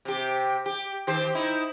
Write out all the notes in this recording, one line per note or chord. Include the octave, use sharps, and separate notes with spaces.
C3 G4
G4
D#3 G4 C5
D#4 E4